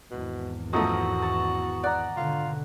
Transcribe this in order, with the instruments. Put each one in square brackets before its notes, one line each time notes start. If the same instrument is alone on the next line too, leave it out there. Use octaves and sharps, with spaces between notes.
[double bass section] G#1 E2 [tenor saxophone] B2
[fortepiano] F#2 F3 A3 [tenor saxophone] F#4 [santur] D#5 A#5
[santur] A5 C#6
[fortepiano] D5 [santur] F#5 A#5
[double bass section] G#1 B2 D3 [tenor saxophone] F4